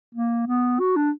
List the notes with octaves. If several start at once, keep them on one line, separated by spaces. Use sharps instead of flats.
A#3
B3
F#4
D4